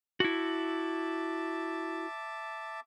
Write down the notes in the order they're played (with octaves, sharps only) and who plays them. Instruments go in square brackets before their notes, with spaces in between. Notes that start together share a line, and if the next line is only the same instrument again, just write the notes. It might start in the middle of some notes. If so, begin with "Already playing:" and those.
[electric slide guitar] E4 F#4 [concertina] E5 A5 D6